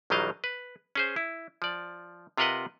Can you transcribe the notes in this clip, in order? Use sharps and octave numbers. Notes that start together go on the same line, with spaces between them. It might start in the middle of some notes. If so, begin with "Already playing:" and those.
A#1 D#3 F#3 G3 D#5 F5
B4
C#4 G#4 C5
E4
F3 D5
C3 F4 A#4 B4 D#5 F#5